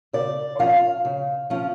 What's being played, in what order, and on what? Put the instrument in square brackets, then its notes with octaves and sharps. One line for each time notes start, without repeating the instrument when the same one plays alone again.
[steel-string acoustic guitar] C#3 D5
F3 C#4 F4 F5
C#3
F3 C#4 F4